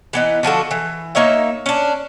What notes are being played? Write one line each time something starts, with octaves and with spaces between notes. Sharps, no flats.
E3 B3 D#4
D3 F3 F#4 A4
E3
A#3 D#4 C#5 E5
C#4 D4